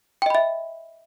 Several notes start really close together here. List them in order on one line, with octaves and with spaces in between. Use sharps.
G5 D#5 B5 E5